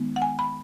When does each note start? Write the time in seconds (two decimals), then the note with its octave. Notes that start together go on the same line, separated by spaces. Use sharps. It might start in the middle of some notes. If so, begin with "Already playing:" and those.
Already playing: D#3 G#3 B3 D#4
0.16 F#5
0.22 G#5
0.39 B5